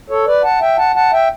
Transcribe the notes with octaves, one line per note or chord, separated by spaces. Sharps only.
A4 C#5
B4 D5
F#5 A5
E5 G5
F#5 A5
F#5 A5
E5 G5